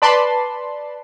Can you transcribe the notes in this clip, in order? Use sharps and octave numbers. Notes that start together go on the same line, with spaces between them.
B4 D5 A5 B5 C6